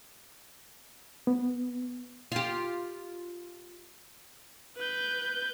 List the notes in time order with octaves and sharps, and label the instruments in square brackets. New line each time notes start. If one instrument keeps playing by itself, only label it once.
[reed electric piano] B3
[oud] F4 G4
[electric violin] B4 G6